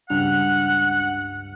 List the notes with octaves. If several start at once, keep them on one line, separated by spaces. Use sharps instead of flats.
C#2 G2 F#5 F6